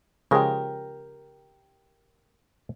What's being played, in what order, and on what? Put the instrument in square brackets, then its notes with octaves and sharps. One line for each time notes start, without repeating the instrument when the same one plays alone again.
[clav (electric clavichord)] C#3 F3 G#3 [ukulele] G4 A#4